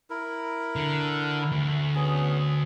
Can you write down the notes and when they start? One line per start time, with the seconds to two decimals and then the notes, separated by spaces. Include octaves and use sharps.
0.10 E4 A#4
0.76 D3
1.52 D2
1.95 B3 C#4 G#4